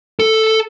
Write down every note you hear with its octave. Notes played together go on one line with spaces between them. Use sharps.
A4